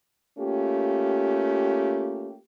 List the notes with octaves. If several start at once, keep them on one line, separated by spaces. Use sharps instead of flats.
A3 A#3 C#4 F4 G4